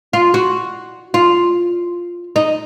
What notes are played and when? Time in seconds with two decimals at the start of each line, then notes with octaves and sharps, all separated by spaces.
0.13 F4
0.34 F#4
1.14 F4
2.36 D#4